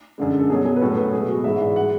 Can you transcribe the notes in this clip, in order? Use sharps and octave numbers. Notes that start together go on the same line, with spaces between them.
F#2 D3 G#3
A4
B2 F#3 G#4
G#4
B4
A2 F#3 A4
B4
B2 G#3 G#4
F#4
G#2 E3 G#3 E5
D5
G#3 F#5